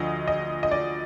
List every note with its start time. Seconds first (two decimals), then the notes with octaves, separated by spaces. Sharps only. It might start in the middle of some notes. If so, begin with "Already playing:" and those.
Already playing: D2 D3 F3 D#5
0.28 D#5
0.63 D#5
0.71 D5